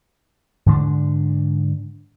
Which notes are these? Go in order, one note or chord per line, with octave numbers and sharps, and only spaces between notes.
G#2 D3 C#4 D4